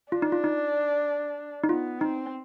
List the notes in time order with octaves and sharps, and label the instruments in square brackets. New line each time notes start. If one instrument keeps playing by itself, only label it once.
[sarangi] D4 [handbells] F4
[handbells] D#4
F4
D#4
D#4
[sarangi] B3 [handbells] F4
[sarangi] C4 [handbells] D#4